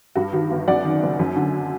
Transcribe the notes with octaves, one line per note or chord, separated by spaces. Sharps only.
G2 F#4
D#3 F#4
G1
F#2 D5 F#5
D#3
F#1
F#2
D3